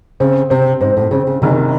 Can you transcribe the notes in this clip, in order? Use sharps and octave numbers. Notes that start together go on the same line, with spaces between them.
C#3 C4
C3 C4
G#2 C4
A2
C#3 C4
C#3
F#1 C3 D#3